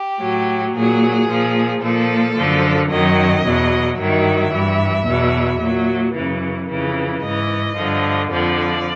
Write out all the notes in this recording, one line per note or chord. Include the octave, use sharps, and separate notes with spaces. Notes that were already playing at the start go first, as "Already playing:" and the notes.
Already playing: G4
A2 F#3
A#2 F#3 G#4
A#2 F3
A#2 F3 A4
F#2 D3 F3
F#2 D#3 F#3 D#5
E2 B2 F#3
G2 D#3 F#3 E5
G2 E3
E2 B2 F#3
A#2 F#3
F#2 C#3 E3
F2 C#3 E3
G#2 E3 D#5
G2 D3 F3
F2 D3 F3 D5